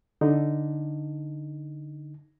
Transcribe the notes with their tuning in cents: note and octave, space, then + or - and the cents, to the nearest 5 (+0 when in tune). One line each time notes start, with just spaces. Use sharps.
D3 +0 D#4 +0